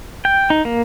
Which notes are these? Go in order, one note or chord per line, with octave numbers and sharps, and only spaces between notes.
G5
D#4
A#3